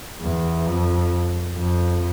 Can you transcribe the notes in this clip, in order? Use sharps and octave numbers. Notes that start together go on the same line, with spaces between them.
E2
F2
F2